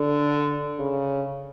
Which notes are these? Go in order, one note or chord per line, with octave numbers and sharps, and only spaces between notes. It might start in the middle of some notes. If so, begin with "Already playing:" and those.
Already playing: D3
C#3